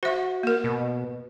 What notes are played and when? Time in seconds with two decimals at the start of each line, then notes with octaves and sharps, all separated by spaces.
0.03 F#4 C5 E5
0.43 A#3 A#4
0.64 B2